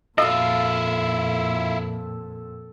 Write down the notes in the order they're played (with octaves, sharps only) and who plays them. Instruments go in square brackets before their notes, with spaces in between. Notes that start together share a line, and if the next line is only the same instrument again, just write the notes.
[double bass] F2 A#2 [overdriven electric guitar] E4 F4 [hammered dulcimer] A4 F5 [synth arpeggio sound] D#5